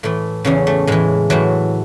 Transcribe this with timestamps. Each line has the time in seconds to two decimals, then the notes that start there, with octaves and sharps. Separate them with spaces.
0.03 A2 E3 A3
0.45 E2 C#3 E3 C#4
0.67 A3
0.87 A2 E3 G#3
1.30 A2 E3 F#3